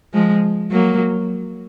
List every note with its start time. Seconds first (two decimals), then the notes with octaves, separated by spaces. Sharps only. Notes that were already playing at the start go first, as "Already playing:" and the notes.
0.14 F3 G#3
0.71 F#3 A#3